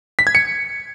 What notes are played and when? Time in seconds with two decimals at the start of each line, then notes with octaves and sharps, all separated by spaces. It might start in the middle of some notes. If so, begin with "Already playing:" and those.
0.19 B6
0.27 G#6
0.35 C#7